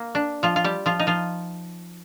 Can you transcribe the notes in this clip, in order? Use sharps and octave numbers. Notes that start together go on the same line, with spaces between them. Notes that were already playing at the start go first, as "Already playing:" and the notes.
Already playing: A#3
D4
F3 F4
F4
G3 G4
F3 F4
D#4
F3 F4